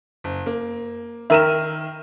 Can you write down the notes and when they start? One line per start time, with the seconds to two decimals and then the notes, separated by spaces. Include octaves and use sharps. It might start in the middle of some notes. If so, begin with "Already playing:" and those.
0.24 F#1
0.46 A#3
1.30 D#3 A#4 E5 D#7 E7